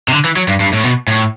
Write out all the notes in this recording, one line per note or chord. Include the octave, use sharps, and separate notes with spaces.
C3
D3
E3
F#3
G2
G2
A2
B2
A2